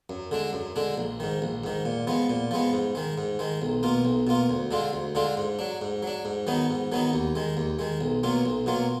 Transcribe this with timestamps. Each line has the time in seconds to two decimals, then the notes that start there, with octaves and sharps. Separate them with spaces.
0.10 F#2
0.31 D3 G#3 D4
0.53 F#2
0.76 D3 G#3 D4
0.98 A#1
1.20 G#2 D#3
1.42 A#1
1.64 G#2 D#3
1.85 A#2
2.07 F3 G#3 B3
2.30 A#2
2.51 F3 G#3 B3
2.73 G#2
2.95 D#3 G#3
3.18 G#2
3.39 D#3 G#3
3.62 B1
3.83 B2 A#3 F4
4.05 B1
4.27 B2 A#3 F4
4.49 D2
4.71 D3 G#3 D4 F4
4.93 D2
5.15 D3 G#3 D4 F4
5.37 G#2
5.59 F#3 D4
5.81 G#2
6.03 F#3 D4
6.25 G#2
6.47 D#3 F#3 B3 D#4
6.70 G#2
6.92 D#3 F#3 B3 D#4
7.13 D#2
7.35 D#3 G#3
7.57 D#2
7.79 D#3 G#3
8.01 B1
8.23 B2 F#3 A#3 F4
8.46 B1
8.66 B2 F#3 A#3 F4